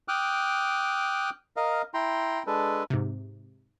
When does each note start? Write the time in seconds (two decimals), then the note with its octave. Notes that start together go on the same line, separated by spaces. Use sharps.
0.08 G5 D6 D#6 F6 F#6
1.56 A#4 D#5 F5
1.94 E4 G5 A#5 C6
2.47 G#3 D4 A4 B4
2.90 G#2 C3